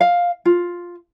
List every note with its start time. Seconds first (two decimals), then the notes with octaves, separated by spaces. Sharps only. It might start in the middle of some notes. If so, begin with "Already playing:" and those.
0.01 F5
0.45 F4